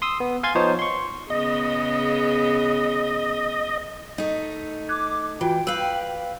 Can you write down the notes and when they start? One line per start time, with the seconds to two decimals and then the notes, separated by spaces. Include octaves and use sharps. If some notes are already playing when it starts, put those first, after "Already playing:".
0.02 C6 D#6 E6
0.20 B3
0.43 F5 G#5 C6 G#6 A6
0.55 F3 B3 D#4 C5 C#5
0.79 C6 C#6
1.30 C#3 B3 G#4 D#5
4.18 A3 D#4 D#5
4.89 D6 F#6 G#6
5.41 E3 F4 F#4 G5
5.67 B4 F5 E6 F#7